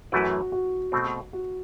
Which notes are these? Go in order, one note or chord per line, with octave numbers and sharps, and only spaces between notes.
F#2 E3 A3 E4 F#4 B4
F#4
B2 A3 C4
F#4